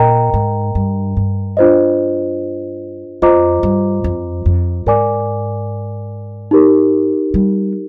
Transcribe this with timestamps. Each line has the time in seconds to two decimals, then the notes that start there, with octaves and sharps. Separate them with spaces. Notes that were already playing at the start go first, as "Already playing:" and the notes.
Already playing: A#2 A#4 D#5 G5 A#5
0.34 G#2
0.75 G2
1.17 G2
1.57 D4 F4 C5 D#5
3.22 F2 F4 C5 D#5 A#5 D6
3.63 G2
4.04 F2
4.46 F2
4.86 G#2 A#4 D5 G#5 D6
6.51 D#4 G4 A#4
7.34 G3